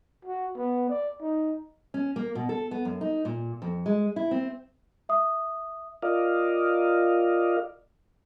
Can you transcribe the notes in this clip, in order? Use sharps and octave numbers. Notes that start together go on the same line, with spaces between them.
F#4
B3
D5
D#4
C#4
A#3
B2
A4
B3
F#2
D#4
A#2
F2
G#3
E4
C4
E5 D#6
F4 A#4 D5 D#5 F5